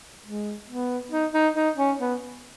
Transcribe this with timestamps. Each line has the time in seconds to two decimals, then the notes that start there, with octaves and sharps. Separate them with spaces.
0.24 G#3
0.68 B3
1.11 D#4
1.33 D#4
1.55 D#4
1.77 C#4
1.99 B3